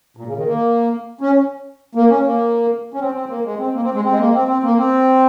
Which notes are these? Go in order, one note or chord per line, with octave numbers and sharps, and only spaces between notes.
A#2
C#3
D#3
A#3
C#4
A#3
C#4
A#3
C#4
C4
C4
A#3
G#3
C4
A#3
C4
G#3
C4
G#3
A#3
C4
C4
A#3
C4